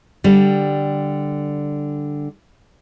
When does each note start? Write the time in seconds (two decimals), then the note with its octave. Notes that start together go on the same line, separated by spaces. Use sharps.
0.24 D3 G3